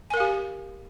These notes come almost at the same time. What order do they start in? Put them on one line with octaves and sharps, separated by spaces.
G#5 A#4 F5 G4